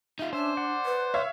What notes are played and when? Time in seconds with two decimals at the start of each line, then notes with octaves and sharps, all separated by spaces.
0.19 D#4 F4 E5
0.33 C#4 D4 C5 E5
0.57 D5 F#5 D6
0.86 B4
1.14 C#5 E5 F5